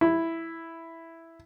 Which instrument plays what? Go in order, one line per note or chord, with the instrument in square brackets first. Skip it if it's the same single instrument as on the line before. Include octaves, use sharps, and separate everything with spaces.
[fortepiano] E4